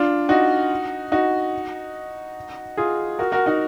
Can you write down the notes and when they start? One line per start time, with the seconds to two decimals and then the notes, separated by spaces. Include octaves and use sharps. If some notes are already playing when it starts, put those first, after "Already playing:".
Already playing: D4 F4
0.29 D#4 F#4
1.12 D#4 F#4
2.77 F4 G#4
3.19 F#4 A#4
3.32 F#4 A#4
3.46 D#4 F#4